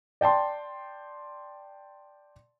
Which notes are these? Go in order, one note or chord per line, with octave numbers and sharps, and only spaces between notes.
D5 G5 A5 C6